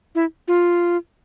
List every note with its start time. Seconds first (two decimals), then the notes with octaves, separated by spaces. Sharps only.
0.15 E4
0.48 F4